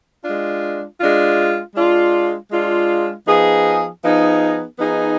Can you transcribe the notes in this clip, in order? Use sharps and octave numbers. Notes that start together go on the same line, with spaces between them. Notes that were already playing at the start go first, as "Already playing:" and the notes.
G#3 D4 F4
G#3 D4 F4
G#3 D4 F4
G#3 D4 F4
F3 B3 D#4 G#4
F3 B3 D#4 G#4
F3 B3 D#4 G#4